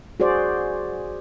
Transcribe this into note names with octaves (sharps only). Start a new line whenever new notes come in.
F#4 G#4 C5 D5